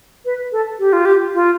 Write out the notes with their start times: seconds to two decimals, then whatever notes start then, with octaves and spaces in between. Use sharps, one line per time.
0.25 B4
0.52 A4
0.79 G4
0.93 F4
1.05 G4
1.34 F4